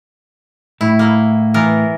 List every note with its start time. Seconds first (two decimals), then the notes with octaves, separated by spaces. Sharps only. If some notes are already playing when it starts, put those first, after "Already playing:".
0.81 A2 E4
0.99 A#3 E4
1.54 E3 B3 A#4